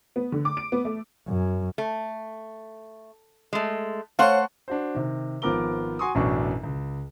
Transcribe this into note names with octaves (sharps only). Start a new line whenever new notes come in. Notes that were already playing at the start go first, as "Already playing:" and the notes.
B3
D3
D6
D7
B3
A3
F#2
A3
G#3 A3
A3 C5 C#5 F5 F#5
D4 F#4 C5
C3 D#3
G#1 F3 B3 A#4 D6 G7
F#4 G#5 C6 C#6 D#6
A1 F#2 B2 F#3 D4 C#6
C#2